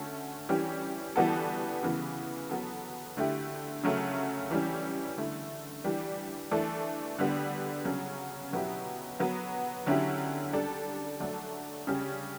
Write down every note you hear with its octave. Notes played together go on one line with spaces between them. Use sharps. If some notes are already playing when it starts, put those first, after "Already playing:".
Already playing: D3 A3 C#4 F#4 A4
E3 G3 C#4 G4
E3 G3 B3 F#4 A4
C#3 E3 B3
F#3 B3 F#4 A4
D3 A3 E4 G4
C#3 F#3 A3 C#4
E3 G3 C#4
D3 A3 E4
E3 G3 D4 G4
E3 A3 D4 A4
D3 G3 B3
C#3 F#3 C#4
B2 F#3 B3 E4 G4
F#3 B3 F#4
D3 F#3 C#4 E4 G4
G3 D4 A4
F#3 A3 D4 A4
C#3 G3 C#4 G4